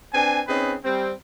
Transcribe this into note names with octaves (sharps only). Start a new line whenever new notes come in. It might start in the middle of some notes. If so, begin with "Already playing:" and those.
C4 D4 B4 G#5
C4 C#4 D#4 G#4 B4
G3 C4